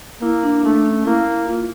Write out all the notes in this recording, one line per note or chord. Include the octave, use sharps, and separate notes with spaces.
A#3 E4
D4
A3 D4
C#4
A#3 E4
E4
F4